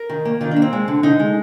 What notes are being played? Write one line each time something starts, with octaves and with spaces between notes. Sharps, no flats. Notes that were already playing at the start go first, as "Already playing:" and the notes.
Already playing: A#4
D#3
A#3
D#3 F4
D4
A#3
C4
G#3
D3
D3 D#4
G#3